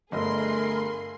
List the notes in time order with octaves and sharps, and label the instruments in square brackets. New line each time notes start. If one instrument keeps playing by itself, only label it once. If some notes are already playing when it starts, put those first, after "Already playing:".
[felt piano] G1 D#5 [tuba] A3 [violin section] G#4 C6 [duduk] A#4